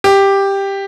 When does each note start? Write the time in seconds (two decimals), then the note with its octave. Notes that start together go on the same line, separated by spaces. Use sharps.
0.04 G4